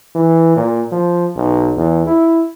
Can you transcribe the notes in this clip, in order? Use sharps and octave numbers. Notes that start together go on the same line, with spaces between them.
E3
A#2
F3
B1
E2
E4